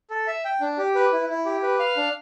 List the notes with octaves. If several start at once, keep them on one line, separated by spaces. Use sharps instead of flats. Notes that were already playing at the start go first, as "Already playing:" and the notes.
A4
E5
G5
D4
G4
B4
E4
E4
G4
B4
F5
D4